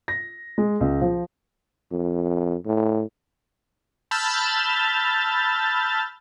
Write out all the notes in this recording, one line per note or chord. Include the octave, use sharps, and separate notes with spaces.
A#6
G#3
C#2
F3
F2
A2
A5 B5 E6 F6 G6 A6